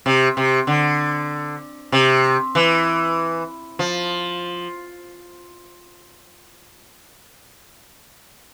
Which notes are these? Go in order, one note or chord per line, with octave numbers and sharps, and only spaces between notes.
C3
C3
D3
C3
E3
F3